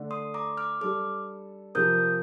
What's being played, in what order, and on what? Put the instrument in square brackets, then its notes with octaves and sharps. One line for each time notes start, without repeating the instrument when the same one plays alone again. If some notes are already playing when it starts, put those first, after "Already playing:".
Already playing: [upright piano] D3 A3 D4
[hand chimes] C6 D#6
A#5 D6
D6 F6
[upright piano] G3 D4 A4 [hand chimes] D6 F6
[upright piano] C3 F3 C4 G4 A#4 [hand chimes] D#6 G6